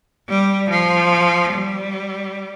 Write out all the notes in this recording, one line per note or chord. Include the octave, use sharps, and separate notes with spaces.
G3
F3
G3